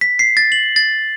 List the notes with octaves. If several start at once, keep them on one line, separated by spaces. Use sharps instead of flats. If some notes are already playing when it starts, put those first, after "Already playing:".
B6
C7
A6
F#7
A6